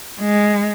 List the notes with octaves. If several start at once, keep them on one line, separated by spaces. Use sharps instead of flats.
G#3